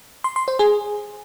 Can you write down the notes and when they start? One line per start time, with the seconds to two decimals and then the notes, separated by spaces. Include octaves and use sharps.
0.24 C6
0.36 C6
0.48 C5
0.59 G#4